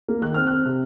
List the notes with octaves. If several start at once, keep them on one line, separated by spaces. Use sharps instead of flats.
A#3
D#3 F#6
C4 F6
C4 F#6
C3